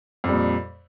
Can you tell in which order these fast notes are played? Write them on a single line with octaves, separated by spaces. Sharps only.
F2 G3 A#2